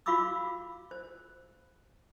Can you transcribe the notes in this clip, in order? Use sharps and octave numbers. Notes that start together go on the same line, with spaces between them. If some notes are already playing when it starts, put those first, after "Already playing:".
F4 F#4 F5 B5 D6 E6
C5